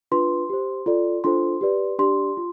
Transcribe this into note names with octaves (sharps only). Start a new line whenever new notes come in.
D4 F4 B4 C6
G4 C5
F4 A4 D5
D4 F4 A4 C5 C6
G4 B4 D5
D4 G4 D5 C6
F4